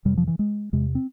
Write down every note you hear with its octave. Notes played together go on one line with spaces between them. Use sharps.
F2 C3 G3
F3
E3
G#3
E2 C3 G#3
C4